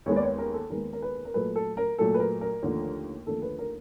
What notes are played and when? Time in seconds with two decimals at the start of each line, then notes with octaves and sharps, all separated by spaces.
0.06 D#2 D#3 G#3 B3 C#5
0.16 D5
0.22 C#5
0.38 A#4
0.54 A4
0.70 D#2 D#3 G#3 B3 A#4
0.93 A#4
1.02 B4
1.25 A#4
1.34 A#2 F#3 A3 B4
1.56 A4
1.77 A#4
1.98 A#2 F#3 A3 A4
2.14 B4
2.20 A#4
2.41 A#4
2.62 D#2 D3 F3 A3
3.26 D#2 D3 F3 A3 A4
3.42 B4
3.59 A#4